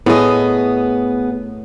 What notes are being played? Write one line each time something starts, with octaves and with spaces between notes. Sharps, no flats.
A2 B3 G#4 D#5